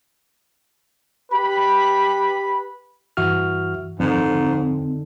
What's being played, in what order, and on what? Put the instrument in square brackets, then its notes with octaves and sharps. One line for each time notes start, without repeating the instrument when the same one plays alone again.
[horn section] G4 B4 B5
[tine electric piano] G2 E3 F#4 E5 F6
[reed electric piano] F2 [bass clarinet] G#2 [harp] D3 D#3 [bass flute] C4